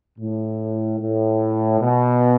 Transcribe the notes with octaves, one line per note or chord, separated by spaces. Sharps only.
A2
A2
B2